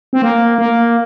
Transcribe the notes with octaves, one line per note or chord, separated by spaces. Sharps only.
C4
A#3
A#3